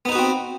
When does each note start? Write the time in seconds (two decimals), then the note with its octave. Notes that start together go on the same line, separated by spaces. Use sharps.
0.05 B3
0.09 D#4
0.12 B4
0.15 F#4
0.18 C4